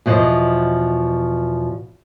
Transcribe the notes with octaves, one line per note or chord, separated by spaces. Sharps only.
E2 B2 F3 C5 D#5